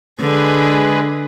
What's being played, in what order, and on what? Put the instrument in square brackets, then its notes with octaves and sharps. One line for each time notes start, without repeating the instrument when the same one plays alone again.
[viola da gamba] D3 [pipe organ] G#3 G#4 B4